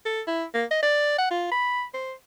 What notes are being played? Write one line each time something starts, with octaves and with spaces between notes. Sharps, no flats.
A4
E4
A#3
D#5
D5
F#5
F4
B5
C5